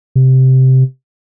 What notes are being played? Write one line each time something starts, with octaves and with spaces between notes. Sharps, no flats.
C3